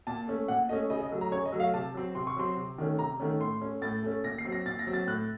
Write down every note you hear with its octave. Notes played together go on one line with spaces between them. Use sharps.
A#2 A5
A3 C#4
A#2 F#5
A3 C#4 D#5
C#3 D#5
D#5
F#3 A3
A#5
C#3 C#5
D#5
F#3 A3
F5
C3 A5
F#3 C4
C3 C6
C#6
F#3 C4 C6
C3
D#3 A3 C#4
C3 A#5
D#3 A3 C#4
A2 C6
A3 C#4
A2 A6
A3 C#4
A#2 A#6
C7
F#3 C4
A#6
A#2 A6
A#6
F#3 C4
A6
A2 F#6